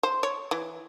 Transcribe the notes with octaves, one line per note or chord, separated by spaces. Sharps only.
C5
C#5
E3